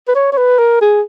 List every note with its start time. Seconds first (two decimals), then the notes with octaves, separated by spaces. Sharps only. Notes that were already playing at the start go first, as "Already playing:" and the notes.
0.08 B4
0.15 C#5
0.32 C#5
0.37 B4
0.59 A#4
0.81 G#4